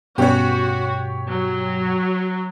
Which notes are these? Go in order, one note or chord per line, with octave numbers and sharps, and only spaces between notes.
G2 B2 B3 C#4 F#4 G4 B4 C#5
F#3